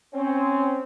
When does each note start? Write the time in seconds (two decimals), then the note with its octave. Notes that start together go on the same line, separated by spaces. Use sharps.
0.14 C4 C#4